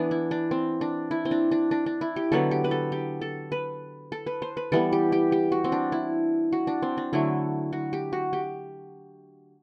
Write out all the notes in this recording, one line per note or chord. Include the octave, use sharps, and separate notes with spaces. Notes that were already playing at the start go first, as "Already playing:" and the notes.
Already playing: E3 B3 D4
E4
D4
C4
D4
E4
C4
D4
D4
D4
D4
E4
G4
D3 F#3 B3 A4
G4
B4
A4
G4
A4
B4
A4
B4
C5
B4
E3 G3 B3 A4
G4
G4
G4
F#4
C4
D4
E4
F#4
D4
C4
D4
D3 F#3 A3 E4
F#4
G4
F#4
G4